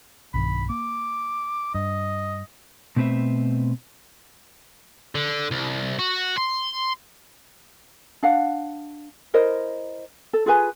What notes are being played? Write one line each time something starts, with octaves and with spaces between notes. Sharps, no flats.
B1 G2 D#3 B5
A#3 D6
G2 D#5
B2 A3 C4 B4 C5 E5
D3
C2
F#4
C6
D4 F5 F#5
E4 A#4 C5 D#5
A4
F4 G#4 B4 G#5